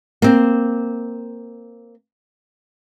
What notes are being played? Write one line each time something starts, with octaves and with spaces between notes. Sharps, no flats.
A#3 C4